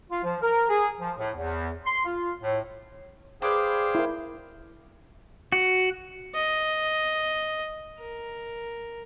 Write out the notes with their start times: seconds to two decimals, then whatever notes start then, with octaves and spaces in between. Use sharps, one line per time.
0.10 F4
0.24 F3
0.42 A#4
0.69 G#4
1.00 F3
1.18 A2
1.36 E2
1.85 C6
2.05 F4
2.42 A2
3.42 G#4 B4 C5 D5 F5 G5
3.95 E4 A#4
5.52 F#4
6.35 D#5
7.99 A#4